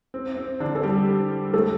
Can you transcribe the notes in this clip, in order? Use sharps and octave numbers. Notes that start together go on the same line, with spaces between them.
C4
C4
D3 D4
A4
G3 G4
A3 A4